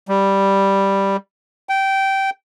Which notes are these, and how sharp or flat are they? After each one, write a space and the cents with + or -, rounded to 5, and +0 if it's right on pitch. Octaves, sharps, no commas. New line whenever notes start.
G3 +0
G5 -15